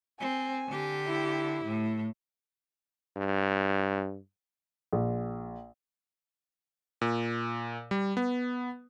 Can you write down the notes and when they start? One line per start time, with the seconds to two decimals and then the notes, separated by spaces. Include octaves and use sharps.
0.20 C4 G#5
0.69 D3 G4
1.07 E4
1.65 A2
3.17 G2
4.93 A#1
7.01 A#2
7.91 G3
8.17 B3